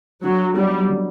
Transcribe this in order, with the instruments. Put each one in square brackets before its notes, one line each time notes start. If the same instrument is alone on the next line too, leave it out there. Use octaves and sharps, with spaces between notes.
[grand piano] D3 [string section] F#3
[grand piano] F#3 B3 D#4 G4 [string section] G3
[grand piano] D3